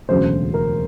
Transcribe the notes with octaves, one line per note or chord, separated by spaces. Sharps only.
E1 D2 C#3 F#3 A3 C5
A#4